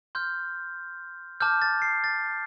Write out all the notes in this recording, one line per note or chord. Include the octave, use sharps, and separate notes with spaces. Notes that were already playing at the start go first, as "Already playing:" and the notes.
C6 F6 G6
A5 D6 F6 G6
A6
C7
A6